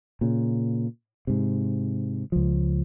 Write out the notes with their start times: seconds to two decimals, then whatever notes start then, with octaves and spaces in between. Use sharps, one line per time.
0.21 A#2 C#3
1.27 G#2 C3
2.32 C#2 F3